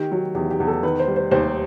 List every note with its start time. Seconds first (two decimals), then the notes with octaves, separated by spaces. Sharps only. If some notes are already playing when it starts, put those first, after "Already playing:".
Already playing: D#3 G4
0.12 F#3
0.35 E2 G4
0.51 G4
0.60 E2
0.67 A4
0.83 D#3 B4
0.99 C5
1.08 G3
1.16 C5
1.31 D#2 C5